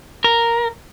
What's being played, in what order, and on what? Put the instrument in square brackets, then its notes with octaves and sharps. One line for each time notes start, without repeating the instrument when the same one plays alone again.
[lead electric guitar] A#4